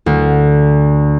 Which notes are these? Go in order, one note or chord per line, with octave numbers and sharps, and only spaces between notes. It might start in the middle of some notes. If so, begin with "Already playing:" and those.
D2